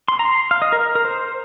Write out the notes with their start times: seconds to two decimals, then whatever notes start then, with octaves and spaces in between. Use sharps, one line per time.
0.08 C6
0.19 A#5
0.25 C6
0.51 F5
0.62 D#5
0.72 A#4
0.95 A#4
1.05 C5